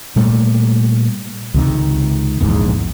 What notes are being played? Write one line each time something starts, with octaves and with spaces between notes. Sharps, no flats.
A#2 G3 A3
C#2 C3 D#3
D#1 A#1 E2 G#2